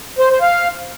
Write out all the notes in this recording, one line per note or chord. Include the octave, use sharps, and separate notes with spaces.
C5
C5
F5